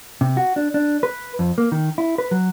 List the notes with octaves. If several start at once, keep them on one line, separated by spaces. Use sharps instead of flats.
C3
F#4
D4
D4
B4
F2
A#3
D#3
E4
B4
F#3